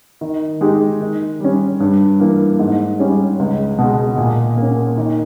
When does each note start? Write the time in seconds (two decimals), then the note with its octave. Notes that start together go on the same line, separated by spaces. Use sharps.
0.21 D#3
0.61 G#3 D#4 G4
1.01 D#3
1.41 G3 C#4
1.80 G2
2.20 E3 A#3
2.59 G#2
2.99 G3 C#4 G#4
3.39 C#2
3.78 B2 G#3
4.18 A#2
4.57 A#3
4.62 C#4
4.98 D#3